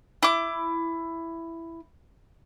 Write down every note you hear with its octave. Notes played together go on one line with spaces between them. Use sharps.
E4 D6